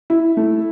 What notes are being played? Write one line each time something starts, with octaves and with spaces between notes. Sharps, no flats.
E4
A3